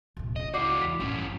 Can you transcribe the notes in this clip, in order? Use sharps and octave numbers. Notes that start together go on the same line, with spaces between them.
D1 C3
C#2 C#3 D#5
E4 F#4 D5 D6 C7
E2 B6
A1 G2 F3 C#4